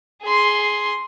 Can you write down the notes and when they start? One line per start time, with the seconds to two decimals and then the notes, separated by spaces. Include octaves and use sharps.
0.23 G#4 C6